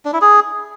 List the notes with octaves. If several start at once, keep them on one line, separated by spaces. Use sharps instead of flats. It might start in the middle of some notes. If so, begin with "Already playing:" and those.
D4
E4
G#4